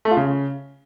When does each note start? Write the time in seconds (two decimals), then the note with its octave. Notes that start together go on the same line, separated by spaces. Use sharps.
0.05 A3
0.11 F4
0.17 C#3